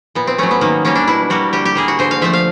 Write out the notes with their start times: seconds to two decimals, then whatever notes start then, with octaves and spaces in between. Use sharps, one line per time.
0.15 A#2 B3
0.27 C4
0.38 F#3 A3 C#4
0.51 B3
0.61 D#3 A#3
0.85 G3 A#3 C#4
0.95 D4
1.07 B2 E4
1.30 G3 A#3 F#4
1.53 D3 G4
1.65 G4
1.75 G3 A#3 G#4
1.88 F#4
1.99 D3 C5
2.11 F5
2.22 F3 A3 E5
2.33 F5